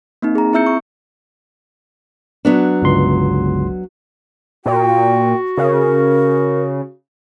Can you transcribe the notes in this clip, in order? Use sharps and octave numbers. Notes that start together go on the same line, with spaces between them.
A#3 C4 D#4
G#4 A#5
C4 E4 E5 E6 G6 C#7
C#6
F#3 B3 D4
G1 C#2 C6
A#2 F#4 G5
C#3 A#4